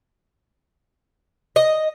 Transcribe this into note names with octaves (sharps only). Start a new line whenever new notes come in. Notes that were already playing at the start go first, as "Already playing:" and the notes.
D#5